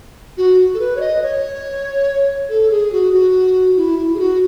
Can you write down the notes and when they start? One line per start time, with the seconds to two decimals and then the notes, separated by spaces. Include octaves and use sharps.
0.37 F#4
0.74 A4
0.80 B4
0.96 C#5
1.00 D#5
1.22 C#5
2.49 A4
2.70 G#4
2.92 F#4
3.13 F#4
3.76 E4
3.98 E4
4.14 G#4
4.19 F#4